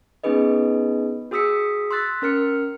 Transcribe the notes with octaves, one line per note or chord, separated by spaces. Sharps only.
B3 C#4 D#4 G#4 B4 D#5
F#4 G#4 D#6 E6 B6 C#7
C6 E6 F#6 A6 B6
C#4 A#4 F6 C#7